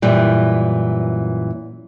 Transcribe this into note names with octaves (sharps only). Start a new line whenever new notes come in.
F#2 A#2 E3 G3